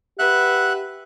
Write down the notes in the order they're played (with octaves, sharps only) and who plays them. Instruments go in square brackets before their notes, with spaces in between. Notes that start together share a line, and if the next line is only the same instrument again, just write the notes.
[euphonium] G4 [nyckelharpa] B4 [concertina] E5 F#5 F#6